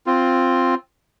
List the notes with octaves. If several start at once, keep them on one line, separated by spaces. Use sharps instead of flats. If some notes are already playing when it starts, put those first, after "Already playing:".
C4 F4